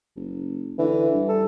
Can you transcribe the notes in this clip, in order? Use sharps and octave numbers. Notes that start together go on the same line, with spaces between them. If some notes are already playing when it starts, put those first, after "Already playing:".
F#1
D3 E3
G2
A4